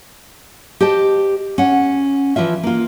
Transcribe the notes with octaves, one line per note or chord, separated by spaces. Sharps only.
G4 C5 D#5 A5
C#4 F#5
E3 F3 F4 E5
A#3 F4